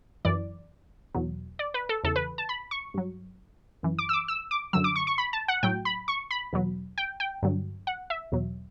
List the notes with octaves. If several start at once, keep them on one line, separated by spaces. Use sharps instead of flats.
F#2 E3 D5
E2 B2 F#3
D5
B4
A4
E2 C#3 E3 A4
B4
A5
B5
C#6
G2 F#3
F#2 E3
D6
E6
D6
E6
D6
F#2 D3 F#3 E6
D6
C#6
C#6
B5
A5
F#5
A2 F#3 G5
B5
C#6
B5
E2 B2 F#3
G5
G5
G2 D3 F#3
F#5
E5
E2 B2 F#3